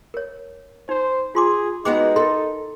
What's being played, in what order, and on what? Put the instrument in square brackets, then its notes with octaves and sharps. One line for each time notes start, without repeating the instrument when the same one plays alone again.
[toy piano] A#4 C#5
[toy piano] D#4 [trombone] C5
[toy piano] F4 C6 D6 [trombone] G#4
[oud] G#3 B3 F#4 [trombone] D#4 [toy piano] G5 D6
[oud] A4 [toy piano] A#4 C6